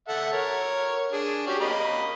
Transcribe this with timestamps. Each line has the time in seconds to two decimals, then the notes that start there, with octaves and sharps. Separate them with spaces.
0.08 A4 E5 F#5
0.33 A#4 C#5
1.12 D4 G#4
1.47 C#4 F#4 G4
1.60 A#3 D#5 B5